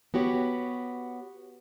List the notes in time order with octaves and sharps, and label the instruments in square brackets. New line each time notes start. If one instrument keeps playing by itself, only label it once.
[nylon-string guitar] B3 F#4 G4 C#5